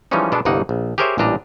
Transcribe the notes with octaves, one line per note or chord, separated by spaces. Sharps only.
E3 F3 G3 G#3 C#4 D#4
B2 G#3 B3 D4 A4
G1 C2 G2 A#3 D#4 F#5
A#1
G4 G#4 A#4 C5 C#5 E5
A1 A#2 G3 D4 D#5 A#5